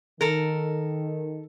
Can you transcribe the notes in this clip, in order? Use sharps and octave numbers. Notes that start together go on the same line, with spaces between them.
D#3 A4 A#4